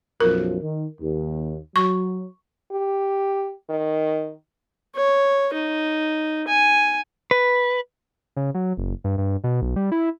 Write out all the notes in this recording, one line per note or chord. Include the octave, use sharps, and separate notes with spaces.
B1 F#2 F3 A#4
D#3
D#2
F#3 C#6
G4
D#3
C#5
D#4
G#5
B4
C#3
F#3
F#1
G2
G2
B2
B1
G3
E4